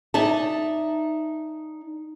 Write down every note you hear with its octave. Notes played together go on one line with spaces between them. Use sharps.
D#4 D5 E5 A5